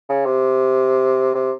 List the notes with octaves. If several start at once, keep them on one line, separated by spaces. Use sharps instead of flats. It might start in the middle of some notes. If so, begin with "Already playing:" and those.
C#3
C3
C3